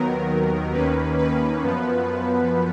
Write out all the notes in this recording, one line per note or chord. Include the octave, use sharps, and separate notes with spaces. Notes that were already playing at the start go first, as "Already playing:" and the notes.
Already playing: D#2 D#3 F#3 B3 A#4
D#2 D#3 A#3 C#4 B4
B4
F#2 F3 B3